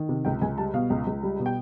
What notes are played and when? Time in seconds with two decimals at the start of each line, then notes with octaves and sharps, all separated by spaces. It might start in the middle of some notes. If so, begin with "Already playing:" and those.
Already playing: D#3
0.09 C3
0.25 C#2 G5
0.42 C#2 G#5
0.58 G3 A5
0.74 B2 F5
0.90 C#2
1.07 C#2
1.23 G3
1.40 B2
1.46 G5